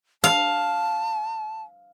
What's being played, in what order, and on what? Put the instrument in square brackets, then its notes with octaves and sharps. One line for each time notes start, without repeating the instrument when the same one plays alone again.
[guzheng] F5 [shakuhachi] A5